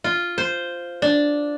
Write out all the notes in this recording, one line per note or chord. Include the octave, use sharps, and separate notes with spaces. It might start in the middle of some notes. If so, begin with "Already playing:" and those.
F4
C5
D4